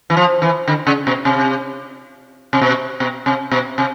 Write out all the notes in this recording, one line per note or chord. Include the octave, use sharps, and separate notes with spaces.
E3
F3
E3
D3
C#3
B2
C3
C3
B2
B2
C3
B2
C3